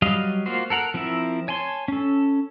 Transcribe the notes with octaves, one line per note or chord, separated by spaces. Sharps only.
F#3 G3 D#5 F5
A#3 F4 F#4 C5
A4 A#4 F#5 A#5
F3 C4 E4 A#4 E5
C#5 G#5 A5 C6
C#4 A4